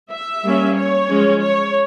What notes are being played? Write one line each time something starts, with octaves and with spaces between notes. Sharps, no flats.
E5
G3 A#3 C#4
C#5
F3 G#3 C#4
C#5